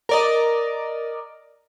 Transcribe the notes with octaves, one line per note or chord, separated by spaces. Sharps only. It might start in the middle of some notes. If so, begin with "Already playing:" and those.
A#4 D5 D#5